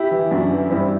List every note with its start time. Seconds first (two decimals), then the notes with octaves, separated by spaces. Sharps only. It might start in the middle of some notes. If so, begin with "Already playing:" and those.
Already playing: E4 G4
0.11 E3
0.31 F#2 D4 F#4
0.51 E3
0.71 G2 C4 E4